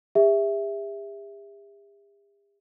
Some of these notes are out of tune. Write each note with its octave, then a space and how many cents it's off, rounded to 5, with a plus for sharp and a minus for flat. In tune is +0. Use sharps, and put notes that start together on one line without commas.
G4 +45 E5 +0